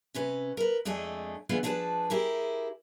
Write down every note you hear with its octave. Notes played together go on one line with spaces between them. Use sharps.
C3 C#4 B4
A#4 B4
F2 G#3 A3 D4 G#5
D3 E3 B3 F4 G#4 B4
F3 D4 F4 G#4 B4 A5
E4 G4 G#4 A#4